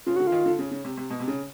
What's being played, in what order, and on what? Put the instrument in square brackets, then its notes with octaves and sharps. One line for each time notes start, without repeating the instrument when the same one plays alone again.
[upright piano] C#3 [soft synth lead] F4
[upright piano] D3 [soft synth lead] F#4
[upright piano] D#3 [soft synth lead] F4
[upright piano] D3
C#3
C#3
C3
C3
B2
C3
C#3